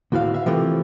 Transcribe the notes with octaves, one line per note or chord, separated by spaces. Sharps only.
D2 A2 E4 F#4 F5
E5 F5
C3 E3 F3 A3 A#3